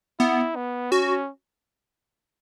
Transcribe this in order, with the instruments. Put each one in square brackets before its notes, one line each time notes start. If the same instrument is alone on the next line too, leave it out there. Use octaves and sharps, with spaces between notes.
[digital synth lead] B3 [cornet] E4
[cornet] B3
[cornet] C#4 [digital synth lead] F#4